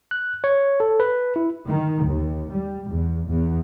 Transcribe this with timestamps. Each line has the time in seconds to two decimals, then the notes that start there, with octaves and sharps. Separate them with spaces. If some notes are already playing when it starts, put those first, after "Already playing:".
0.11 F#6
0.44 C#5
0.80 A4
1.00 B4
1.36 E4
1.67 D#3
2.06 D#2
2.52 G3
2.89 E2
3.28 E2